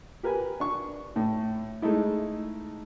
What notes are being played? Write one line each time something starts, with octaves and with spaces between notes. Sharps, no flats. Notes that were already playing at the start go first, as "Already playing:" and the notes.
G4 A#4 B4 G#5
D4 C#6
A2
G#3 A3 D#4 E4